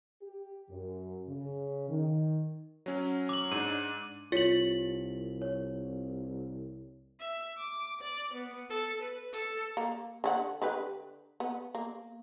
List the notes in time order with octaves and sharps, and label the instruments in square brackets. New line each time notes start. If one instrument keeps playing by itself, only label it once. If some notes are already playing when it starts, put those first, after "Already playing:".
[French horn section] G4
F#2
C#3
D#3
[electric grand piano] F#3 C#4
[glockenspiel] D6 F#7
[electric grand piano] G#2 D4 [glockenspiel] D#7
[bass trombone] C2 [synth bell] F4 F#7 [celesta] C#5 B6
[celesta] C#5
[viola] E5
D6
D5
B3
A4
B4
A4
[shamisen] A#3
D3 C#4 F#5
D3 G4 B4
B3
A#3